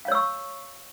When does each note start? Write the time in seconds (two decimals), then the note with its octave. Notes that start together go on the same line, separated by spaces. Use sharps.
0.05 F5
0.08 C#5
0.12 E6
0.15 C#6